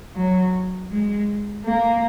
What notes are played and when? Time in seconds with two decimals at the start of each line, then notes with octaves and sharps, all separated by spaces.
0.16 F#3
0.91 G#3
1.65 A#3